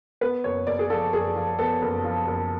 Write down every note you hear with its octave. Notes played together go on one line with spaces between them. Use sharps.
B3 B4
F#1 C#5
F#1 D5
G#4
F3 A4
F#1 G#4
F3
B3 A4
F#1
F3
F#1